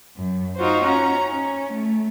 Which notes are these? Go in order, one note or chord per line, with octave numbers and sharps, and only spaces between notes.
F#2
D#4 F4 F#4 C5
C#4 A#5
C#4
A3